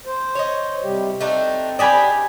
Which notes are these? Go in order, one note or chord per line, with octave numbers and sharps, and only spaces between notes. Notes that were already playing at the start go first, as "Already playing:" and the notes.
C5
C#5 D#5
C3 G3 G4
A3 C4 D4 D#4
D4 G4 D5 D#5 G#5 B5